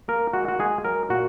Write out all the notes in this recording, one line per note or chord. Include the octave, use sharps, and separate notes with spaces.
A#3 A#4
G#3 F#4
F#4
G#3 G#4
F#3 A#4
A#2 F#4